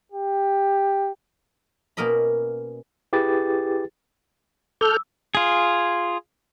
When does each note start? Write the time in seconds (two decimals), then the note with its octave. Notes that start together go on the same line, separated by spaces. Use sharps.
0.12 G4
1.97 B2 A#3 C#4 A#4 D#5 B5
3.13 E4 G4 G#4 B4 A6
4.81 A4 D6 E6 F6 G6
5.35 F4 G#4